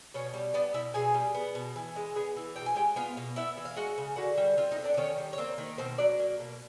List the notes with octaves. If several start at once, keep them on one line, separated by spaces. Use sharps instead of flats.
B2 C#4 C#5
G3
B3 D4 D5
B2 E4 E5
B2 G#4 G#5
G3
B3
B2
E3
G#3
B3 G#4 G#5
E3
B2 G5
G#5
G#3 G4 G5
B3 F4 F5
B2
B3 E4 E5
E3
F5
G#3 F#4 F#5
C#3
D3 F#4 F#5
G3
C4 F4 F5
D#4 D#5
D3
D4 D5
D5
D#3 C#4 C#5
G3
C#5
A#3 C4 C5
D#3
B2 C4 C5
F#3 D4 D5
A#3
B2